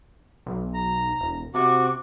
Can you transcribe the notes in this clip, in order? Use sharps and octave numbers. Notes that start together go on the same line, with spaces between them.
B1
A#5
E1
C3 F#4 D6